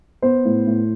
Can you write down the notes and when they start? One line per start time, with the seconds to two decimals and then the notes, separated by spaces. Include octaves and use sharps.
0.22 B3 C5
0.45 A2
0.67 A2